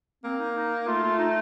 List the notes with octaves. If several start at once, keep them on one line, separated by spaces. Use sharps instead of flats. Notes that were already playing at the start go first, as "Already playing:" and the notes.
A#3 C4
D#4
D#4
A3 F4
F4
D#4